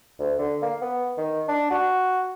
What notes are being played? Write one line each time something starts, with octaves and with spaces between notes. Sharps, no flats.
D2
D3
A#3
B3
D#3
D4
F#4